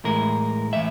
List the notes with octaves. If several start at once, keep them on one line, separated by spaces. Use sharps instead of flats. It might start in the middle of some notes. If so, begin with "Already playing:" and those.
A2 E3 G#3 A#4
A2 E3 E5